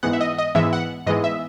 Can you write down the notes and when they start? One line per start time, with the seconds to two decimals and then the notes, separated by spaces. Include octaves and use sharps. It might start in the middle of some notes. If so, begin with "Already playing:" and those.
0.03 G#2 E3 G#3 B3 F#5
0.13 E5
0.21 D#5
0.38 D#5
0.55 G#2 E3 G#3 B3 E5
0.73 F#5
1.07 G#2 E3 G#3 B3 D#5
1.24 E5